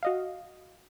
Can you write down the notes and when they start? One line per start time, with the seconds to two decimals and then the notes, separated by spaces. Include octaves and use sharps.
0.03 F#4 D#5 F5